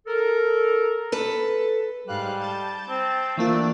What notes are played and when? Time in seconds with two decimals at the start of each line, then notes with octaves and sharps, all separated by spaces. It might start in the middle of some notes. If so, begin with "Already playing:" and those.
0.07 A4 A#4
1.12 A4 B4
2.07 G#2 G3 F5 F#6
2.40 A5 G6 A6
2.89 C4
3.37 E3 A3 A#3 D4 F4 D5